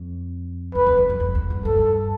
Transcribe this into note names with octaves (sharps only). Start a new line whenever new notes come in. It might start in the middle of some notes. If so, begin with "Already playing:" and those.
Already playing: F2
F2 B4
E2
F2
F2
F2
E2
G2
G2 A4